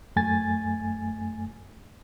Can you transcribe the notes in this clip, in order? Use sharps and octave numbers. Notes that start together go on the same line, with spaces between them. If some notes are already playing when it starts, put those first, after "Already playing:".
F#2 A3 G#5 A6